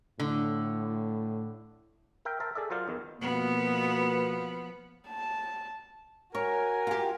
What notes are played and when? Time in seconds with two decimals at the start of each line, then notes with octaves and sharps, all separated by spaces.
0.20 A2 D3
2.25 A#4 E5 G5
2.40 A#4 C5 E5 A5
2.55 G#4 A4 D5 E5
2.70 F#3 F4 A#4 C5 D5 F5
2.88 E2 D#3
3.21 B2 F3 A#3 B3
5.08 A5
6.35 F#4 A#4 C#5 G#5
6.87 F4 G4